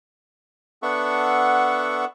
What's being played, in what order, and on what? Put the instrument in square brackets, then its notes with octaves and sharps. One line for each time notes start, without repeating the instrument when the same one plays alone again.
[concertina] B3 D4 A4 E5 F#5 C#6